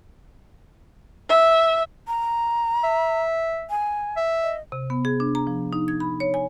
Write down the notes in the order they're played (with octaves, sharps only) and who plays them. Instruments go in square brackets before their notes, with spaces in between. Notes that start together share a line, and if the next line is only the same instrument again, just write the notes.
[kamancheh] E5
[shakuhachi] A#5
[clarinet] E5
[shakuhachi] G#5
[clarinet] E5
[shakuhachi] D#5
[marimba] C3
B3
G#4
D4
A#5
F3
D#4
G#6
B5
C#5
G#5